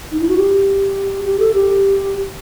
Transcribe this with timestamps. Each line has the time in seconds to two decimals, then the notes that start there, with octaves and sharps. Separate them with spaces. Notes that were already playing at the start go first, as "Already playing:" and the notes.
0.12 D#4
0.20 E4
0.29 F#4
0.37 G4
1.24 G4
1.40 A4
1.54 G4